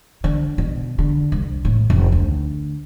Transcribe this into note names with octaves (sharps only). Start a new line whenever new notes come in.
D3
B2
D3
C2
A2
F1
D2